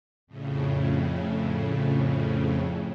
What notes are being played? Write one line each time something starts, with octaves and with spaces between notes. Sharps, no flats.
F2 A2 C#3